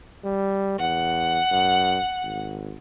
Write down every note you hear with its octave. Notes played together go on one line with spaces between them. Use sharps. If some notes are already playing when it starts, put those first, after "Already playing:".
G3
E2 F#5
F#2
G#1